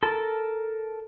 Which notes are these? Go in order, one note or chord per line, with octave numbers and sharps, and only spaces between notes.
A4 A#4 A5